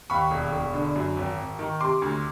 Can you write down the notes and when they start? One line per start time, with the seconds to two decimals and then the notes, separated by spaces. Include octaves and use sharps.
0.10 D#2 B5 C#6
0.31 E1
0.52 E1
0.74 D3
0.96 F#2
1.17 G#1
1.38 G#1
1.59 D#3
1.81 C3 C6 D6
2.02 D2